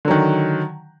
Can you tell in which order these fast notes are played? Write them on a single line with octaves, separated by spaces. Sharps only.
D3 F#3 D#3